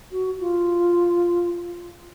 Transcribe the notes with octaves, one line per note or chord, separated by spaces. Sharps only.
F#4
F4